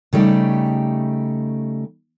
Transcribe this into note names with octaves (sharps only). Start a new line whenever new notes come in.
C#3 G3 A3 D#4 G4